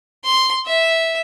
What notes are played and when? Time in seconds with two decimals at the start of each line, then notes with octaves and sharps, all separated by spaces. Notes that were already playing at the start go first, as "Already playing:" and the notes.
0.25 C6
0.66 E5